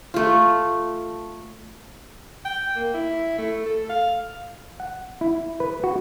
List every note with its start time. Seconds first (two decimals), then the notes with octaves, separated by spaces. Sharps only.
0.14 A3 F4
2.45 G5
2.76 A#3
2.94 E4
3.38 A3
3.66 A4
3.89 F5
4.80 F#5
5.21 E4
5.60 B4
5.84 F#4